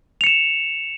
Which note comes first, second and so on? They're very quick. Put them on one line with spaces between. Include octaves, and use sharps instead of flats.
F7 C#7 E7